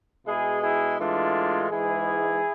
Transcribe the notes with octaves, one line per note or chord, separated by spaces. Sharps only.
B2 G#3 E4 G#4
E4 G#4
A2 E3 G#3 D4 F4
G#2 E3 G#3 E4 G#4